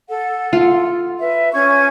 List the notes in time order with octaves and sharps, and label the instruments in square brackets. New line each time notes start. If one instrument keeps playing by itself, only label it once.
[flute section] A4 F#5
[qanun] F4
[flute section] B4 E5
C#4 C#6 G#6